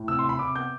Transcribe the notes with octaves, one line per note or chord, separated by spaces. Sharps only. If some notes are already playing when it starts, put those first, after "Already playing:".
Already playing: A2
C3 E6
C6
C3 B5
C3 D6
B3 G6